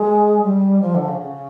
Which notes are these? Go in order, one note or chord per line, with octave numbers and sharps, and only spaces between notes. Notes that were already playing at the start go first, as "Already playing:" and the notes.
Already playing: G#3
G3
F3
D3
C#3
C#3